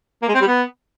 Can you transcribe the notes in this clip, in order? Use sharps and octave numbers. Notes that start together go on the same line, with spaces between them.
A#3
G#3
C4
G3
B3